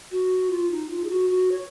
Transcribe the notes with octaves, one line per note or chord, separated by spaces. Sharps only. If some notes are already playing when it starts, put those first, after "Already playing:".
F#4
F4
D#4
F4
G#4
F#4
F#4
C#5